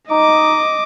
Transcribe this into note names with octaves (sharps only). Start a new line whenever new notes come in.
D#4 D#5 D6